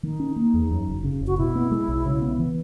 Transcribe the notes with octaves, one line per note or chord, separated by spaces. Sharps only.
D#3 D#4
C#4
A#3
E2
F#2
F#1
C#3
F#1
F#4
B2 E4
B3
G#3
B1
C#3
B3
E3